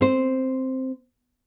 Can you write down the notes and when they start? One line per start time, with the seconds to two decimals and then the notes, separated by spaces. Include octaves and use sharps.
0.01 C4 C5